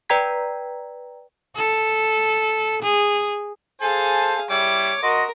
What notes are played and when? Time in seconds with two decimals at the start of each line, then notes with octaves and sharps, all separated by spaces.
0.10 B4 D5 G5 A#5 G#6 B6
1.56 A4
2.82 G#4
3.81 G#4 A4 C5 F5 G#5 A5
4.50 G3 E4 C#5 D6
5.03 F#4 A#4 D#5 C6